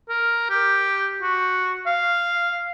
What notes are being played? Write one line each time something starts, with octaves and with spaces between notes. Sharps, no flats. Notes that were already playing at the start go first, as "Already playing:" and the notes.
A#4
G4
F#4
F5